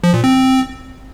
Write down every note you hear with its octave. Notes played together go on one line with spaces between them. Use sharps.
F3
A#2
C4